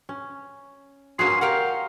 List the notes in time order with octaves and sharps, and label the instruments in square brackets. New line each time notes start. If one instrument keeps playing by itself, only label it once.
[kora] C#4
[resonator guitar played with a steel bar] G2 A#2 A#3 [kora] C#4 F#4 G#4 [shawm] C6
[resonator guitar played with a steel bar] G4 A#4 F#5 [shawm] F5